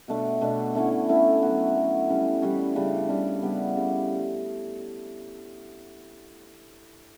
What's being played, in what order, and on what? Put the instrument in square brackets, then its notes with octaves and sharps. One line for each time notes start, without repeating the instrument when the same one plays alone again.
[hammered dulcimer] B2 A3 D4
B2 A3 D4
D3 A3 C#4 E4
D3 A3 C#4 E4
F#3 B3 F#4
F#3 B3 F#4
E3 G3 C#4
E3 G3 C#4
C#3 G3 D4
C#3 G3 D4
C#3 G3 B3
C#3 G3